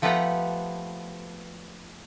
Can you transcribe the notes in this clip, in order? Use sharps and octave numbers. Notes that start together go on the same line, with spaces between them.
F3 A3 B3 G4 B4 A#5